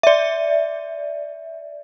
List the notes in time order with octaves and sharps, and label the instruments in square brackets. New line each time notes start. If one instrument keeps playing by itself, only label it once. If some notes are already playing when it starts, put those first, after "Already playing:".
[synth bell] D5 E5